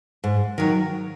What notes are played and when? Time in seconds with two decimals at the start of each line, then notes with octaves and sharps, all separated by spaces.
0.24 G#2
0.58 D#3 F#3